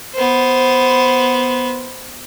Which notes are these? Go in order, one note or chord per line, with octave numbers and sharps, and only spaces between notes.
B3 C5